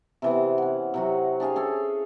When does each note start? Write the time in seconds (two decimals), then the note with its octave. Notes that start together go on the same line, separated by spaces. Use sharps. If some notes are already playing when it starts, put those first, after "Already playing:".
0.22 C3 E3 B3
0.58 C#4 F#5
0.94 C3 F#3 F#4
1.40 D4 G4 G#4 F5
1.56 C#4 G#4 A4